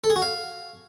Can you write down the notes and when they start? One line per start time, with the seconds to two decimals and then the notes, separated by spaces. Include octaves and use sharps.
0.04 A4
0.10 G#4
0.16 F#4
0.22 F5